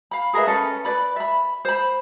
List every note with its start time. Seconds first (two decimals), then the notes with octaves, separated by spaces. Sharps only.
0.11 F5 B5
0.33 G#4 A#4 B4 E5
0.47 C#4 A4 B4
0.85 B4 D5 B5
1.16 E5 B5
1.65 C5 B5